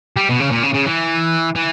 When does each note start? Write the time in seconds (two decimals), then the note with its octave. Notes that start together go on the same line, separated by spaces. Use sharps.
0.17 G3
0.29 B2
0.40 C#3
0.51 A#2
0.63 C#3
0.74 C#3
0.86 E3
1.55 E3